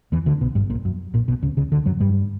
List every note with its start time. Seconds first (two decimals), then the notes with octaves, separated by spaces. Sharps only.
0.12 E2 E3
0.26 D2 D3
0.41 B1 B2
0.55 G1 G2
0.70 A#1 A#2
0.85 F#2
1.14 A#1 A#2
1.28 B1 B2
1.42 C#2 C#3
1.57 C#2 C#3
1.72 D2 D3
1.86 F#2 F#3
2.00 G2 G3